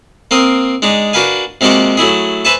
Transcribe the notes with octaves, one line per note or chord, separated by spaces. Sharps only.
A#3 C4 A#4 D#6
G#3 D4 D#4
D4 F#4 A#4 B4 F5 G#5
C3 G#3 A#3 F#4 D5 F#5
F#3 A3 E4 G#4
B4 C5 E5 G#5 A5 C#6